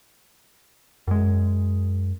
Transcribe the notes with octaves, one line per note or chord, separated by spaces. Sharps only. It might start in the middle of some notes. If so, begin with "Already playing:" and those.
F#2 G#3